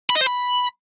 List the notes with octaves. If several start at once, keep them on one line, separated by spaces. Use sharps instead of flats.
B5
D#5
C5
B5